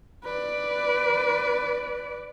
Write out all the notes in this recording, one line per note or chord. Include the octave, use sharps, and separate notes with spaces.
B4 D5